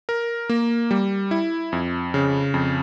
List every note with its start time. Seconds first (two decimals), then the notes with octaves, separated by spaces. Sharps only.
0.09 A#4
0.49 A#3
0.91 G3
1.31 E4
1.72 F2
2.14 C#3
2.54 F2